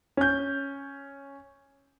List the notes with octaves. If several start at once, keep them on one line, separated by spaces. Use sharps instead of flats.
C#4 G6